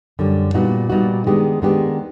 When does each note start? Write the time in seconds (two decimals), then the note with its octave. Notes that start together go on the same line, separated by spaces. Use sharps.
0.19 F#2 D3 G3
0.54 A#2 G3 B3 D#4 F#4
0.90 A#2 G3 B3 D#4 F#4
1.27 D#3 G#3 B3 D4 G4
1.62 D#3 G#3 B3 D4 G4